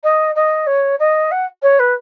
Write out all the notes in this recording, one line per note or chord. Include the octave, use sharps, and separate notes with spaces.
D#5
D#5
C#5
D#5
F#5
C#5
B4